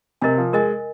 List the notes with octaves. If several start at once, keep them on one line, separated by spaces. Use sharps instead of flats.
C3 A#4 D#5 G#5
F3
G#3 A#4 D#5 G#5